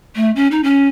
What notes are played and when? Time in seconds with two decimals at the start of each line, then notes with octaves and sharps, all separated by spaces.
0.16 A3
0.36 C#4
0.51 D#4
0.63 C#4